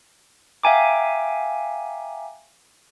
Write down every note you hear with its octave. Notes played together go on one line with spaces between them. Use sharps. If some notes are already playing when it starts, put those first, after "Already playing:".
E5 F5 G5 G#5 A#5 D6